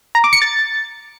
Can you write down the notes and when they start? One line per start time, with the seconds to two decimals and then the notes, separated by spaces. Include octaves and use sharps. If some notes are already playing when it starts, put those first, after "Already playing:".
0.15 A#5
0.24 D6
0.33 C#7
0.42 A6